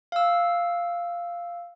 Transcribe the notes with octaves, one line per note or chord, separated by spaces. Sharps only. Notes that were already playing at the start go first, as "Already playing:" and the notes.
F5 E6